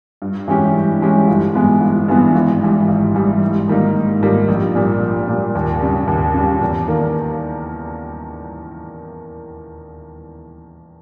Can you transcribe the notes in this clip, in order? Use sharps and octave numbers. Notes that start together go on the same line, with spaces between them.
G2
E3 G#3 C#4 G4
G2
E3 G#3 C#4 G4
G1
G2 E3 G#3 B3
G1
G2 E3 G#3 B3
G#1
G#2 E3 G3
G#1
G#2 E3 G3
G#2
D#3 G3 A#3 D#4
G#2
D#3 G3 A#3 D#4
A#1
A#2 G3
A#1
A#2 G3
D#2
C#3 G3
D#2
C#3 G3
E2
D#3 A#3